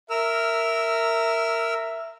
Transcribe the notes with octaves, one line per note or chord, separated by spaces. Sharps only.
A#4 E5 E6 F6